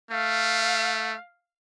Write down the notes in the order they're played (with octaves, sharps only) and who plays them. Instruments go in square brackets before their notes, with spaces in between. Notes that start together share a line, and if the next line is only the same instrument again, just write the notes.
[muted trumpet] A3 [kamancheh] F5